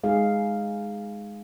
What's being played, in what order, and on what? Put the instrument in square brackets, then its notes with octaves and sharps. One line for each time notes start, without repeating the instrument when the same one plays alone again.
[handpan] G#3 D#4 G#4 F5